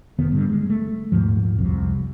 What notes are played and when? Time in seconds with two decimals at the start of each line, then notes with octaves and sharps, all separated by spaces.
0.19 F1 D#3 B3
0.32 G2 D3
0.49 G#3
0.70 A3
1.12 D#1 G#1 G#2 F3
1.59 C2 F2 C3